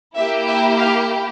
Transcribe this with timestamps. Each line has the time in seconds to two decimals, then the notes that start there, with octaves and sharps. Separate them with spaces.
0.16 A#3 E4 G4 E5
0.47 E5
0.79 F5